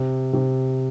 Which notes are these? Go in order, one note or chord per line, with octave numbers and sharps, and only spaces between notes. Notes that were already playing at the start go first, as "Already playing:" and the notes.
Already playing: C3
C3